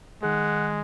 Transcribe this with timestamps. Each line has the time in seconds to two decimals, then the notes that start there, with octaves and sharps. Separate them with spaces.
0.23 D#3 G#3 G#4 F#5